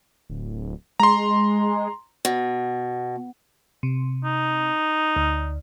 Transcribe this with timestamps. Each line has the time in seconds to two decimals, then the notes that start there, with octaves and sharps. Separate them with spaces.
0.30 D1
1.00 G#3 A#5 C6
2.25 B2
3.83 C3
4.24 D#4
5.16 D2